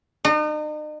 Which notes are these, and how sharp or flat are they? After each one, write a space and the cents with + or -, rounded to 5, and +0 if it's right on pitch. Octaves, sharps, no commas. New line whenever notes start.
D#4 -40